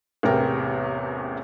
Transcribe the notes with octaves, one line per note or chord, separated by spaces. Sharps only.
A1 E2 C3 A#4 G5